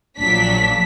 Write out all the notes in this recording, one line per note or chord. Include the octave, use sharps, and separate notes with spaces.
A#1 A#2 F#3 D4 B6